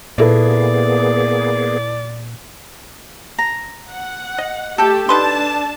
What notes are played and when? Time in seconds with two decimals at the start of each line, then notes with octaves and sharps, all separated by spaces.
0.18 A#2 A#3 B3 E4 G#4 A4 B4 D5
3.39 A#5
3.88 F#5
4.38 D#5
4.78 A3 G4 A4 G5 A5
5.09 D4 D#4 B4 A5 C6